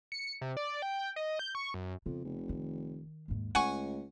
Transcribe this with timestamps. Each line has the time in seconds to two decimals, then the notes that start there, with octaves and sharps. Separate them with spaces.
0.12 C#7
0.42 C3
0.57 D5
0.82 G5
1.16 D#5
1.39 G6
1.55 C#6
1.74 F#2
2.06 F2 C#3 B3
2.24 F1
2.49 D#3
3.28 D#2 G#2
3.55 C#2 A3 F#5 G#5 C#6